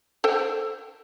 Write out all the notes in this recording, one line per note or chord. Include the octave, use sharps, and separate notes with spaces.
A4 C5 G5